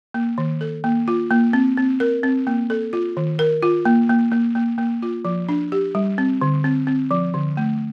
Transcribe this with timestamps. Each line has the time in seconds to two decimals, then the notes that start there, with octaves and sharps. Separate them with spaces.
0.14 A#3
0.38 D#3
0.61 A4
0.84 A#3
1.08 F4
1.31 A#3
1.53 C4
1.77 C4
2.00 A#4
2.23 C4
2.47 A#3
2.70 A4
2.93 F4
3.17 D#3
3.39 A#4
3.63 F4
3.85 A#3
4.10 A#3
4.32 A#3
4.55 A#3
4.78 A#3
5.02 F4
5.25 F3
5.49 D4
5.72 G4
5.95 G3
6.18 C4
6.41 D3
6.64 C4
6.87 C4
7.11 F3
7.34 D3
7.57 A3